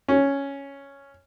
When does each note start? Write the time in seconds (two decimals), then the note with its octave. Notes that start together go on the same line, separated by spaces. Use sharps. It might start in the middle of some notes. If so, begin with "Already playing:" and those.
0.08 C#4